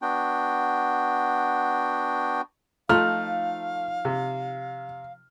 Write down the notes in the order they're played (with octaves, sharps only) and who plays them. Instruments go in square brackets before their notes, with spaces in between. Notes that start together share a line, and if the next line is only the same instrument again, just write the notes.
[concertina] B3 D4 F#4 G5
[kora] F3 D#4 F4 [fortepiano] A3 [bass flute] F5 [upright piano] F6
[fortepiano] C3